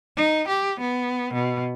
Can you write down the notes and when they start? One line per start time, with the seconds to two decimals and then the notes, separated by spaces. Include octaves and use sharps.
0.16 D#4
0.48 G4
0.80 B3
1.34 B2